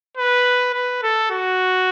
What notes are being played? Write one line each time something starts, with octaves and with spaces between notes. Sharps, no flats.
B4
B4
A4
F#4